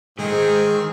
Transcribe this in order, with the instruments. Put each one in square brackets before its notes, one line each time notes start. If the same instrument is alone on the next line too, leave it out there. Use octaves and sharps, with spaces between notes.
[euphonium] G#2 [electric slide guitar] D#3 [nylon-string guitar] G#3 [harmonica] C4 G#4